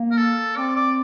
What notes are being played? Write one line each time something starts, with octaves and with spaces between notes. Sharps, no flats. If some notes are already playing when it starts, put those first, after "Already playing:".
Already playing: A#3
A#4
A4
C4 D5
D5